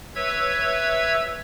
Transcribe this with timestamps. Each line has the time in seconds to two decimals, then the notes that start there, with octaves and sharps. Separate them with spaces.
0.15 B4 C#5 E5 E6 G#6